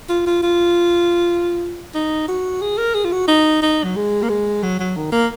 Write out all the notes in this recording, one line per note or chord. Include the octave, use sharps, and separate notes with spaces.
F4
F4
F4
D#4
F#4
G#4
A#4
G#4
F4
F#4
D#4
D#4
F#3
G#3
A#3
G#3
F#3
F#3
D#3
A#3